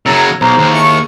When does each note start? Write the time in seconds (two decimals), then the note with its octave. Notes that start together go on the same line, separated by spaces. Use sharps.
0.06 F#2 C#3 F#3 A#5 E6 G#6 A6
0.41 B1 G#4 C5 A#5
0.58 D#2
0.72 E4 A5 C#6